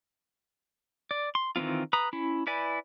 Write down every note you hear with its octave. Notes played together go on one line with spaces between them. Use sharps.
D5
C6
D#3 E3 G3 C4 F4
B4 A#5 D#6
C#4 E4
E4 B4 D5 G#5